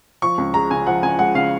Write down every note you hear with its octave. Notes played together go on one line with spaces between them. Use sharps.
F3 C#6
C#2
G#3 A#5
C#3 G#5
F3 F#5
C#2 G#5
G#3 F#5
C#3 F5